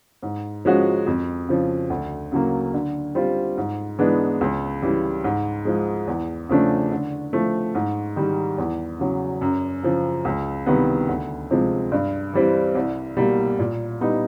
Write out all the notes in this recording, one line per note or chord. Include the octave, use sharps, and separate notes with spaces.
G#2
F3 G#3 C#4 F#4
F2
C#3 F3
D2
C#3 F#3 A#3
D3
G3 C4 F4
G#2
E3 G#3 B3 D4
C#2
C#3 E3 G3
G#2
F3 G#3
E2
C#3 F3 A3 D4
D3
F3 A3
G#2
D#3 G3
E2
C#3 F#3
F#2
C#3 F3
C#2
C3 D#3 G3 B3
D2
C3 F3 G#3
G2
E3 G3 C4
C2
B2 G3 A#3
A#2
G3 B3 D#4